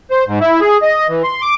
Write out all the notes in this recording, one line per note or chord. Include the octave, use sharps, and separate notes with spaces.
C5
G#2
E4
G#4
D#5
E3
C6
D6